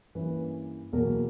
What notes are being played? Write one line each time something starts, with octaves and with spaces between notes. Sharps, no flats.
G2 E3 A#3 C#4 B4
E2 B2 F#3 A#3 A#4